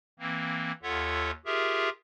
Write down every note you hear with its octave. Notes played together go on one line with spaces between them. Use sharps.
E3 A#3 C4
D#2 F4 A4 C#5 E5 F#5
F4 G4 G#4 A#4 E5